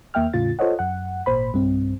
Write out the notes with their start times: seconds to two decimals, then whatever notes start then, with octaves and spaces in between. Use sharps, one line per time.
0.14 D#2 A#3 E5 G5 F6
0.33 E2 A2 C#3 F4 A6
0.59 F4 A4 C5 C#5 D#5 F#5
0.79 F#2 F#5
1.26 G#1 A#2 C5 B5
1.53 B1 G2 C4